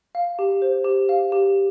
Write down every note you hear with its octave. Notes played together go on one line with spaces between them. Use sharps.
F5
G4
C5
G4
F5
G4